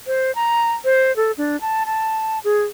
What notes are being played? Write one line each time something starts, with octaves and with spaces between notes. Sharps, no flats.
C5
A#5
C5
A4
D4
A5
A5
G#4